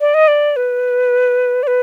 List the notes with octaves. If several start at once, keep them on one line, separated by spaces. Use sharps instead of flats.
D5
D#5
D5
B4
D5
B4